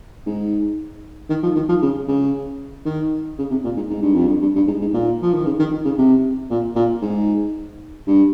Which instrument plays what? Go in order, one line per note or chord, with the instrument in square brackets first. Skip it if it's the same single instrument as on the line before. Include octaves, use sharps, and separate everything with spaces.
[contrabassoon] G#2
D#3
F3
D#3
F3
C#3
C#3
D#3
C#3
C3
A#2
G#2
G#2
G2
F2
G2
G2
G2
G#2
G#2
A#2
F3
D#3
C#3
D#3
D#3
C#3
C3
A#2
A#2
G#2
G2